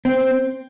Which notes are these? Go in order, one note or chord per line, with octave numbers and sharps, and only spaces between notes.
C4